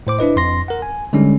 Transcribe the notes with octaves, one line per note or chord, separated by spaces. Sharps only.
A2 C5 D6
D4 E4 B4 D#5
F2 C6 A#6
A#4 F#5
G#5
D3 G3 G#3 C#4 D#4